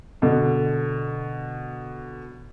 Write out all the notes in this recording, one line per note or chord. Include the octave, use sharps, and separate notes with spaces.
B2 D3